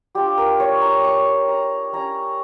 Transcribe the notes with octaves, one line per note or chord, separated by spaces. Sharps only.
G3 D4 F4 G4
A#4
C#5
A#5
C#6
A#5
G3 C#4 E4 A#5